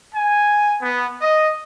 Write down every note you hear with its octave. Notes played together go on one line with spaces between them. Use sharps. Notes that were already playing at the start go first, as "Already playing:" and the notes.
G#5
B3
D#5